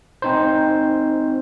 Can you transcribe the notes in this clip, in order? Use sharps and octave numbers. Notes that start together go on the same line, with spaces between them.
C4 D#4 C5